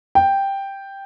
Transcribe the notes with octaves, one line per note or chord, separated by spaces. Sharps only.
G5